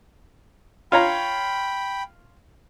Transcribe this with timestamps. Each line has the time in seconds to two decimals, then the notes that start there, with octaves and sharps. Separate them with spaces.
0.92 F4 C#5 G5 A#5 B5